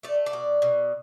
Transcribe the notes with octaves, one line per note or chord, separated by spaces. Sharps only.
A3 D5
D5
B2
B2